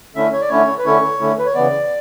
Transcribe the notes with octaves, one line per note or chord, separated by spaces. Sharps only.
D3 A3 C#4 E4 E5
C#5
D5
D3 A3 C#4 E4 C#5
B4
D3 A3 C#4 E4 C#5
D3 A3 C#4 E4
B4
C#5
C#3 E3 B3 D5